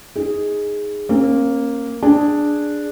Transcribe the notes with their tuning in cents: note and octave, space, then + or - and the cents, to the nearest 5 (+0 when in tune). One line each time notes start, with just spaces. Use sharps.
D#4 +5 G#4 -5
A#3 +0 C#4 -35
D4 +0 G#4 +0